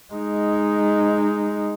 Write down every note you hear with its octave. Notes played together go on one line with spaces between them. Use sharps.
G#3 D#4